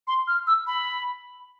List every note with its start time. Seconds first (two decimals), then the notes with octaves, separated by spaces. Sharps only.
0.07 C6
0.27 F6
0.47 E6
0.67 B5